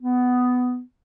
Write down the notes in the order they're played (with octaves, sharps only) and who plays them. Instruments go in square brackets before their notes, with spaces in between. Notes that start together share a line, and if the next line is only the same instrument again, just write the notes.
[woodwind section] B3